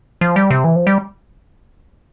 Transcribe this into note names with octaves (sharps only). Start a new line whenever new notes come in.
F3
G3
C3
E3
F3
G3